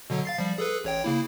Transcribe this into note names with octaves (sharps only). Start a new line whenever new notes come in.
B2 D3 F#3
F5 A6 C7
F3 G3
G#4 A4 B4
A1 C#5 G5
C#3 A#3 E4